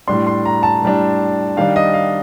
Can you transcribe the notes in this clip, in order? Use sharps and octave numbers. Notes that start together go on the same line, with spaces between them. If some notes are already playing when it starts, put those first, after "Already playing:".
A2 G3 D4 C6
C6
A#5
A5
A2 G3 D4
D#3 G3 D4 F5
D#5
F5